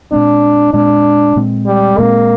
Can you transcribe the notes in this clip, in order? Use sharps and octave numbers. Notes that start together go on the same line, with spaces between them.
A#2 G#3 C4 D4
A#2 G#3 C4 D4
A#2 G#3 C4
G3
A#2 G#3 A#3 C4